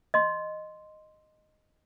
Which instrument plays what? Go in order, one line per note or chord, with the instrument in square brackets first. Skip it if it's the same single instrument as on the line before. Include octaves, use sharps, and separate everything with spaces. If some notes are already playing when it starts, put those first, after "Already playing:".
[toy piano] D#5 C6